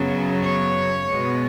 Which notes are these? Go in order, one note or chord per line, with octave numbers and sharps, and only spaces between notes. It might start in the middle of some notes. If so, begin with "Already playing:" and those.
Already playing: F#2 C#3 F#3 B3
C#5
B2 G#3 B3